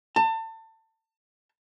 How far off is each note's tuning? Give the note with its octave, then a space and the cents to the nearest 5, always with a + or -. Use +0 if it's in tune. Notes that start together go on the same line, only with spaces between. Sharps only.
A5 +30